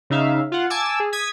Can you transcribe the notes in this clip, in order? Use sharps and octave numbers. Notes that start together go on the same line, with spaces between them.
C#3 D#4 E5 F5
F4 F#5
G#5 A5 D6 E6
G#4
D#6 G#6 B6